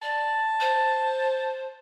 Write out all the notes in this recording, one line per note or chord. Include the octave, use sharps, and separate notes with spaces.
D5 A5
C5